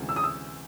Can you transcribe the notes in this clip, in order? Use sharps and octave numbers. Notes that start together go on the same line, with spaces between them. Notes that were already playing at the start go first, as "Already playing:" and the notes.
Already playing: D2 C3 E3 G#3 C#4
E6
D#6
E6